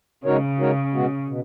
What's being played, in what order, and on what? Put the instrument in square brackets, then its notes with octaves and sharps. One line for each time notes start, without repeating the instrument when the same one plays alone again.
[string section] C#3 [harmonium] G#3 D#4 F#4 A#4 C#5
[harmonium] G#3 D#4 F#4 A#4 C#5
B2 G#3 B3 F#4
B2